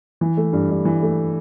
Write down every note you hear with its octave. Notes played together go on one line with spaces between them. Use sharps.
E3
A3
G2
G2
E3
A3